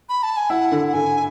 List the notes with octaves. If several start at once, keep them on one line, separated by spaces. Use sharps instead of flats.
B5
A5
G#5
E4 F#5
D3
F#5
D3 G#5